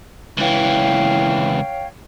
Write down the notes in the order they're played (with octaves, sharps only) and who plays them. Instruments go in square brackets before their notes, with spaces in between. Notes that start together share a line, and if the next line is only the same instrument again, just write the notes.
[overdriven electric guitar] C#2 E3 [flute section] C#5 F5 G5